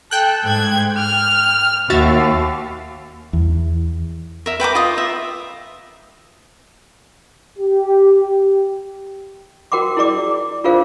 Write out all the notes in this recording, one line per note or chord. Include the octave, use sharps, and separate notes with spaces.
A4 G5 F#6
G#2 G#6
F6
D#2 F#4 E5 A6
E2
A#4 E5
B4 G5 A#5 D6
F4 D#5 D#6
E5
G4
F#4 A#4 G5 C6 D6
E4 G#4 D5 D6
D4 F4 G#4 A#4 C5 F5